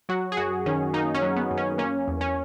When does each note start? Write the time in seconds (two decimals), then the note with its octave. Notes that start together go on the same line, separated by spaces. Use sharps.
0.09 F#3 F#4
0.32 G#4
0.37 F#2 F#4
0.66 D#3 C#4
0.94 A#3 D#4
1.15 C#4
1.22 F#3
1.36 B3
1.51 F#2
1.57 C#4
1.78 A#3 C#4
2.08 E2
2.21 C#4